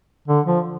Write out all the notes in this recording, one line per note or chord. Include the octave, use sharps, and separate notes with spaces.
D3
F3